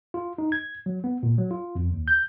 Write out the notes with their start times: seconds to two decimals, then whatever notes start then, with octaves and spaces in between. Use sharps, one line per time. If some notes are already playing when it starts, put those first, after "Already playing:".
0.14 F4
0.38 D#4
0.52 G#6
0.86 F#3
1.04 B3
1.23 A#2
1.38 F#3
1.51 F4
1.75 F2
1.92 D#2
2.08 G6